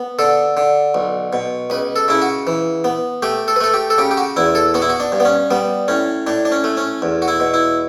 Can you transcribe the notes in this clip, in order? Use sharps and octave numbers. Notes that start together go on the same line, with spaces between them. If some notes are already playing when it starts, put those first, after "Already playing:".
Already playing: B3
D3 A4
D3
B1
B2
C#2 B4
A4
C#3 E4
F#4
E3
B3
A3 G4
A4
B4
A3 A4
G4
A4
C#3 G4
G4
F#4
E2 E4
A4
B3 F#4
E4
F#4
D4
G2
B3
C#4
G3 B3
A2 C#4
A2 D4
D4
C#4
A3
C#4
E2
F#4
E4
B2
E4